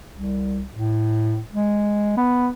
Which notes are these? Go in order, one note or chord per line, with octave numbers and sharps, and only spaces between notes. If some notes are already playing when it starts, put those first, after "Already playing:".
C2
A2
G#3
B3